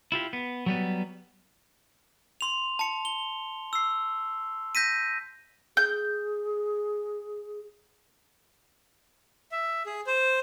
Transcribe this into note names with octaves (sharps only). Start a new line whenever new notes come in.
E4 F4 G4
B3
F#3 G3 B3
C6 F7
A5 C#7
G7
E6 C7
G6 A#6 B6 D#7
G#4 G6
E5
G#4
C5